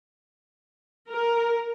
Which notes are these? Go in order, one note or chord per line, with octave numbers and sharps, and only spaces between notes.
A#4